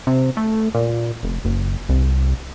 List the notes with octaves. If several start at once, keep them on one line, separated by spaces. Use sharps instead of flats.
C3
A3
A#2
F1
F#1
C2